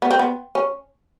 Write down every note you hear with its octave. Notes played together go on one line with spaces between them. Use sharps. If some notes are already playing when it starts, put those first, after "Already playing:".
B3
C4
B3
C#4